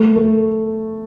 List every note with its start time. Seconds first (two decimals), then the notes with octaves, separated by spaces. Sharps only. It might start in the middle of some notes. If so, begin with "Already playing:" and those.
Already playing: A3
0.16 A3